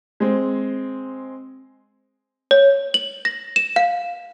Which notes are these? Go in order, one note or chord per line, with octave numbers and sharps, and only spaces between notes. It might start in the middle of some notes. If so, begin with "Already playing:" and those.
G#3 C4
C#5
F#7
A#6
E7
F5